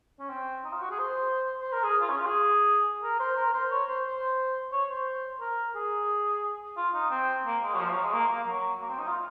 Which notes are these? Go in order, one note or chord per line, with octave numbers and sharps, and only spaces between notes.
C#4
C4
D#4
F4
F#4
G#4
C5
C5
A#4
G#4
F4
C#4
F4
G#4
A#4
C5
A#4
C5
C#5
C5
C5
C#5
C5
A#4
G#4
F4
D#4
C4
A#3
G#3
F#3
F3
F#3
G#3
A#3
A#3
F#3
A#3
C4
D#4
F4